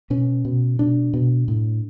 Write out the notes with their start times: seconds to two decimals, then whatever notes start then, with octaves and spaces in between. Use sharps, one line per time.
0.10 B2 C#4
0.45 B2
0.79 B2 D4
1.14 B2
1.48 A2